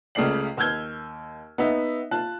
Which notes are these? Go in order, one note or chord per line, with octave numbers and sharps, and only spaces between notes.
C#2 C#3 A3 D5 C7 F#7
D#2 E6 F6 G6 G#6 G7
B3 D#4 E5
F4 A5 F#6